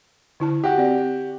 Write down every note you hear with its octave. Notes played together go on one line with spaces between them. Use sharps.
D3 E4 A5
F#4 G4
C4 D5